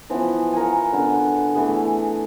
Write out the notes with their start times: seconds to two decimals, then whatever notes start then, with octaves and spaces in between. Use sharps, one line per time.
0.10 E3 F3 B3
0.53 A#4 F5 F#5 G#5
0.93 D3 B3
1.55 E3 A3 B3 G#4